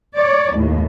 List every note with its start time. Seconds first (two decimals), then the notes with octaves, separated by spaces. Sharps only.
0.16 C#5 D5
0.56 D#2 A2